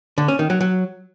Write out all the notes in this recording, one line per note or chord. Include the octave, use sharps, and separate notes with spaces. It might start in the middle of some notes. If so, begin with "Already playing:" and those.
D3
C#4
D#3
F#3
F#3